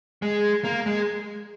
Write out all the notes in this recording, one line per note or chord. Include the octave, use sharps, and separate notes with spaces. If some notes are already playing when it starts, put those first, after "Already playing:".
G#3
A#3
G#3